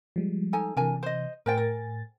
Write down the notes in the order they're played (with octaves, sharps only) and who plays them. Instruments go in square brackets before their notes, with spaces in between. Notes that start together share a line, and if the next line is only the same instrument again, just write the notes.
[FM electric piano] F3 G3 G#3
[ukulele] D#4 A4 G#5
[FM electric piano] C3 E3 [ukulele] D4 A#4 G#5
[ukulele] C5 D#5
[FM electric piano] A2 G#5 A6 [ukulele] A#4 C5 G5
[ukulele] A#4